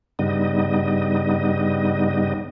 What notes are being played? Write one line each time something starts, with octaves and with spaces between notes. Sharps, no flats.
G2 C#3 G3 B3 D#4 D#5